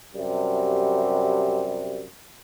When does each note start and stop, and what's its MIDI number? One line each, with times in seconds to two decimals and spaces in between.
0.15 2.03 42
0.15 2.03 48
0.15 2.03 55